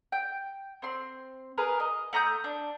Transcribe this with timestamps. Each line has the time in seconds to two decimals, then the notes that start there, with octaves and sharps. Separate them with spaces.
0.12 G5
0.82 C4 C6
1.58 G#4 A#4 B4
1.80 D#5
2.13 A3 A#5 D#6 G6
2.44 D4